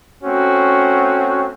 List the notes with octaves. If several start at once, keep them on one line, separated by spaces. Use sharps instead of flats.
A3 C4 C#4 F#4